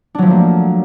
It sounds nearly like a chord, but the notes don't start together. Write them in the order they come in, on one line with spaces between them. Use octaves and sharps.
D4 F#3 F3 A3 A#3